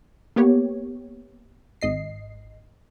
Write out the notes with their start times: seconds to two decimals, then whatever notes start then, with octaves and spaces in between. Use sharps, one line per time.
0.36 A#3 B3 G4 C#5
1.81 G#1 D#5 C7